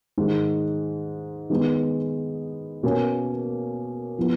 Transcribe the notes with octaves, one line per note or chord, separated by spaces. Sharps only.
G#2 D#3 G#3
D#3 G#3 B3
B2 A#3 C#4
F3 B3 F4